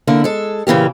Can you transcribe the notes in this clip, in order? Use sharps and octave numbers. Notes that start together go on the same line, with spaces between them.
D3 A#3 E4
G#3 A4
A#2 C#3 E3 A#3 G4